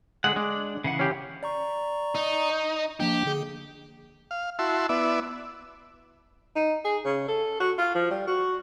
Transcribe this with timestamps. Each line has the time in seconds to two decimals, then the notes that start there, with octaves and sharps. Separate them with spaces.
0.24 D3 G#3 F#5
0.36 G#3 D4
0.84 C#3 E3 F#5
0.99 C#4 G4
1.43 D5 A#5 C#6
2.15 D#4
3.00 F3 A#3 D4 G4
3.26 D3 G#4
4.31 F5
4.59 E4 F#4 E5 A5 C6
4.89 B3 E4 D5 E5
6.56 D#4
6.85 G#4
7.05 C#3
7.28 A4
7.60 F#4
7.78 F4
7.95 F3
8.11 G3
8.27 F#4